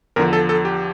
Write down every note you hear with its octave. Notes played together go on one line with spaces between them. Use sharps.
E2 D3 F3 A#4
A4
A4
G4